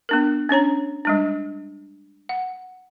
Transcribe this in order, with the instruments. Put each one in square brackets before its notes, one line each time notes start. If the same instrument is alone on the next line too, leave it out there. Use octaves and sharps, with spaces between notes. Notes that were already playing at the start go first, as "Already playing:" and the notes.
[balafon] B3 D4 A#4
C#4 D4 C#5 A#5
G3 G#3 D4
F#5